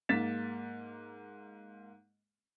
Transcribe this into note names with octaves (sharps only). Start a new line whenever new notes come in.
G#2 A#3 A6 B6 E7